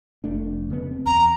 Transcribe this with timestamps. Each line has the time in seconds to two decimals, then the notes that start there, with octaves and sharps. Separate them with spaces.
0.24 F1 A3 D4
0.70 C#3 B3
0.91 C4
1.06 E2 A#5